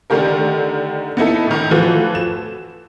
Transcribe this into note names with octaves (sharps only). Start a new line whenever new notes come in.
D3 D#3 A3 G4 A#4
B3 D#4 E4 A4
A2 D#3
E3 F3 A3 F#4 A4 B4
E7